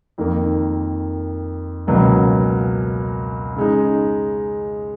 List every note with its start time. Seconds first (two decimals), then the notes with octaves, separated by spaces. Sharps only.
0.18 F2 D#3 A#3
1.87 C#2 B2 F#3 A#3 C#4
3.56 C#3 G#3 D#4